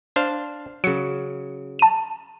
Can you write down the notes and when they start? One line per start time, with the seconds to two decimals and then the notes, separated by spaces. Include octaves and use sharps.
0.16 D4 C5 F5
0.84 C#3 F#3 C#7
1.79 A5 D#7